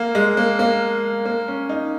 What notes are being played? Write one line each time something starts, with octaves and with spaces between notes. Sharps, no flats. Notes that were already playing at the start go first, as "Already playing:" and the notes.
Already playing: A#3
G#3
A#3
A#3
A#3
C#4
D#4